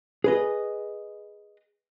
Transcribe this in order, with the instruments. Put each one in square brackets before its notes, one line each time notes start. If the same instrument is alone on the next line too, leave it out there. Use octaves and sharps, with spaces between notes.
[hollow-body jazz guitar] G#4 B4 D#5